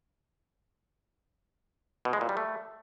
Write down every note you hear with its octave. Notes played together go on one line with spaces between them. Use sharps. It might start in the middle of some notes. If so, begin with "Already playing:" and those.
B2
G#3
A#2
G3
A3